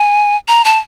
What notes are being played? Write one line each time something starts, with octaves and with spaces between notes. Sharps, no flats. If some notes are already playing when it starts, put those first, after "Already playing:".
Already playing: G#5
A#5
A5